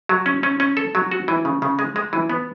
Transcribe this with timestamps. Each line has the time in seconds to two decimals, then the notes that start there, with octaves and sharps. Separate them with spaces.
0.09 F#3
0.26 C#4
0.43 C#4
0.60 C#4
0.77 A4
0.95 F#3
1.11 F#4
1.28 E3
1.45 C#3
1.62 C#3
1.79 G#3
1.96 G#3
2.13 E3
2.30 B3